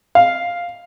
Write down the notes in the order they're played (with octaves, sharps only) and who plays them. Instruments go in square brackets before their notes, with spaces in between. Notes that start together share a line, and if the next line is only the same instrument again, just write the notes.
[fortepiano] F5